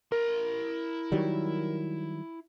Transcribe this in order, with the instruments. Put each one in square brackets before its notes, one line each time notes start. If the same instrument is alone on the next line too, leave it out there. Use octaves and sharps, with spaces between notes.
[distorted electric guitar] E4 C6 [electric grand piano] A#4
[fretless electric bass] D#3 F#3 G3